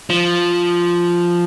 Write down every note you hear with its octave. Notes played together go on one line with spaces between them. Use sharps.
F3